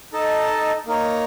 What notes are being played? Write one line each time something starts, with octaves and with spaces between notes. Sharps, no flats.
D#4 A4 D#5 A5
A#3 D#4 A#4 C#5